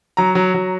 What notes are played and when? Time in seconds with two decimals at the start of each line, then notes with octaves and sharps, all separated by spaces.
0.17 F#3 A#5
0.35 F#3
0.54 F#3